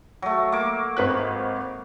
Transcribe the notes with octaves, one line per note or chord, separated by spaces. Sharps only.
F#3 A3
A#3 D6
G#1 B4 F#6